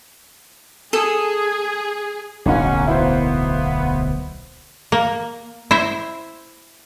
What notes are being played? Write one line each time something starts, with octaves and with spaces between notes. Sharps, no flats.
G#4 A4
D1 B1 A#3 C#4 D#4 F#4
B3 E4 C5
A#3
E4 C5 E5